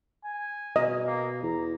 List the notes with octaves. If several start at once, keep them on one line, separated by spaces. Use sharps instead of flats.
G#5
B2 D#5
A#3
E2 A#5